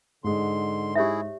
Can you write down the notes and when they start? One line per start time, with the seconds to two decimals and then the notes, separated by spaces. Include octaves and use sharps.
0.24 G#2 D3 G#3 C6
0.95 E4 G4 G#4 C#5 E5